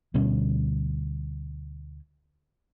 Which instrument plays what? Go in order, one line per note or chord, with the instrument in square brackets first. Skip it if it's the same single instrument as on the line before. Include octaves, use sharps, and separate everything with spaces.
[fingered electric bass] D2 B2 G3 C#4